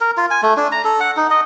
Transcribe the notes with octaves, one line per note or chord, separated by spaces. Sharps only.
A#4
F4
G#5
A3
D4
A#5
A4
F#5
D#4
D#5